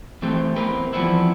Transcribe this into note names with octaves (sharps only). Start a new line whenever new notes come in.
E3 A3 C4 G4
E2 C4 G4 A#4 B4
E3 F3 G3 B3 C4 E4